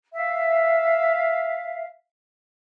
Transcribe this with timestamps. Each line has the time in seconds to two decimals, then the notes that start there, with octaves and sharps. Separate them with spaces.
0.13 E5 F5